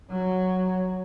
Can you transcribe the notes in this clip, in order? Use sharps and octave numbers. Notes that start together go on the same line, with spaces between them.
F#3